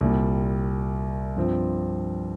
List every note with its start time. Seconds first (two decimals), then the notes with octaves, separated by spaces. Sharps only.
0.01 C2 A#2 G3
1.36 G2 F3 C4